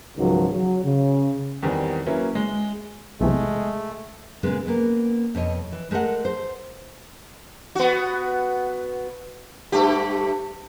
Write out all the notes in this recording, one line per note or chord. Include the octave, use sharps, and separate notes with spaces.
C#2 G#2 D#3 F3 F#3
F#3
C#3
E2 D#3 G3 C4
F#3 A#3 C#4 E4 B4
G#3
B1 E2 C3 G#3 A3
A#2 C#3 G#3 B3
A#3 B3 C#4
F2 B2 C#5 D#5
E3
G#3 A3 G#4 A#4 F#5
C5
B3 F#4
G2 A3 G4